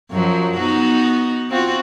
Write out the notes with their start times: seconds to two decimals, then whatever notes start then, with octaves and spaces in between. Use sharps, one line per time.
0.12 F#2 F3 F#3
0.58 B3 D#4 F#4
1.50 C4 F4 F#4